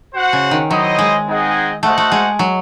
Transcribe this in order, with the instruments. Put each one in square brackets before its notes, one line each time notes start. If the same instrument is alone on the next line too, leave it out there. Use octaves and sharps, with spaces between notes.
[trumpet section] F#4 C5 F#5
[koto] C#3
D#3
[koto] F#3 [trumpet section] E4 C5 D#5
[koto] G#3
[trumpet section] C4 D#4 G#4 D#5 F#5
[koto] A3 [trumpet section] F#4 C5 D#5 F#5
[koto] A3
G#3
F#3